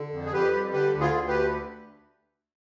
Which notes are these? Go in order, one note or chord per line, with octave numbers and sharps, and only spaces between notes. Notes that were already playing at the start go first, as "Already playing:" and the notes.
Already playing: D3
F2
G#4
F2 G4 B4
G3
D3 G4 B4
D2
F4 G#4
D2
G4 B4